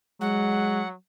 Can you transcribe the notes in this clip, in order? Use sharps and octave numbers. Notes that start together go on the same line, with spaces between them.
F#3 G#3 F#5